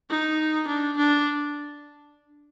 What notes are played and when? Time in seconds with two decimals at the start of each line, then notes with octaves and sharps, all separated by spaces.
0.10 D#4
0.68 D4
0.97 D4